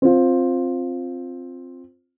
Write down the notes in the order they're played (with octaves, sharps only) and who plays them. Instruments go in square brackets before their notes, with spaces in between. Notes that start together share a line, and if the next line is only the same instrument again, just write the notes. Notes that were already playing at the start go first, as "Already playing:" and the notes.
[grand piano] C4 F4